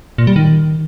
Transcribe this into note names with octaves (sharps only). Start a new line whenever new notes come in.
A#2
G3
D#3